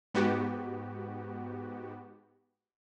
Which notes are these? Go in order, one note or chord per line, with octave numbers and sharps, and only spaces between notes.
G#2 B3 F#4 G4